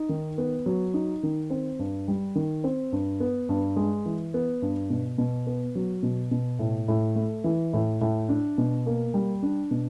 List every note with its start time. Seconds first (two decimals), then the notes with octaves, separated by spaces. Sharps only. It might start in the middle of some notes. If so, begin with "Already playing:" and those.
Already playing: D#4
0.09 D#3
0.38 B3
0.66 F#3
0.94 D#4
1.23 D#3
1.50 C4
1.79 G2
2.08 G3
2.35 D#3
2.64 C4
2.92 G2
3.20 B3
3.49 G2
3.76 G#3
4.06 E3
4.34 B3
4.62 G2
4.90 B2
5.18 B2
5.47 B3
5.75 F#3
6.03 B2
6.31 B2
6.59 A2
6.88 A2
7.16 A3
7.44 E3
7.73 A2
8.01 A2
8.29 D4
8.58 B2
8.86 A#3
9.14 G3
9.43 D4
9.71 B2